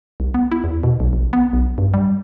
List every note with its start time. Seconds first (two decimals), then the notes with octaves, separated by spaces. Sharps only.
0.20 C2
0.34 B3
0.52 E4
0.64 E2
0.83 B2
1.00 B1
1.13 A#1
1.33 B3
1.53 B1
1.78 G2
1.94 G3